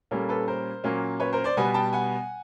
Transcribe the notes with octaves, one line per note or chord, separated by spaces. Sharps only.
A#2 G3 A#3 C#4 A4
A4 B4
A#4 C5
A#2 F#3 A#3 C#4
B4 C#5
A#4 C5
C5 D5
B2 G3 B3 F#5 G#5
G5 A5
F#5 G#5